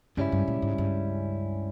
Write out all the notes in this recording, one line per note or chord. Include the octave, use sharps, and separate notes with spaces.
C#2 G2 C#3 G3 C#4 E4
G2
A#2
G#2
G2